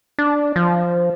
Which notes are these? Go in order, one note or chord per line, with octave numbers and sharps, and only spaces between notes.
D4
F3